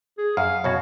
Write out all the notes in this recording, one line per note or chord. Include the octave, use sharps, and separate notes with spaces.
G#4
F#2 F5
F#2 B2 F#4 C#5